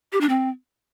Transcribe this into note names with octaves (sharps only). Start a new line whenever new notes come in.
G4
D4
C4